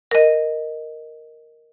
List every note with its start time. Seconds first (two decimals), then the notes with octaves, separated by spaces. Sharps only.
0.11 A#4 D#5